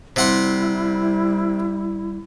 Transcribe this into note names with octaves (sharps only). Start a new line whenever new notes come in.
C3 G3 E4 F#5 C6